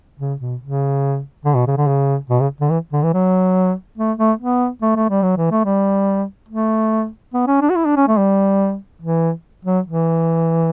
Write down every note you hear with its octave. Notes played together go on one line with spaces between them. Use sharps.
C#3
B2
C#3
D3
B2
C#3
D3
C#3
B2
C#3
D3
E3
D3
E3
F#3
A3
A3
B3
A3
A3
G3
F#3
E3
A3
G3
A3
B3
C#4
D4
F#4
E4
D4
C#4
A3
G3
E3
F#3
E3